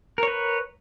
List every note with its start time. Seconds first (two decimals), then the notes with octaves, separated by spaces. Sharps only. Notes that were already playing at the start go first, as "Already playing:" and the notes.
0.18 A#4
0.23 C#5
0.28 B4